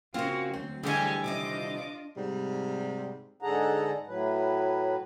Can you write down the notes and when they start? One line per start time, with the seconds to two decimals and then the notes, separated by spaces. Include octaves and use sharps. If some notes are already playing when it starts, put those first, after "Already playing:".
0.14 C#3 A#3 C4 F4 F#4
0.54 D2 F#3 C4
0.83 D3 E3 G3 G4 G#4 C5 D#5 G#5
1.24 C3 D#3 C4 D4 F4 D#5 D6
2.16 G#2 C3 G3
3.42 G#2 D3 G#4 A4 F#5 A#5
4.07 A2 F#3 B4